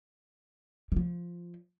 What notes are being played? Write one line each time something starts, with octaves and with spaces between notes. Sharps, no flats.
D#3
F3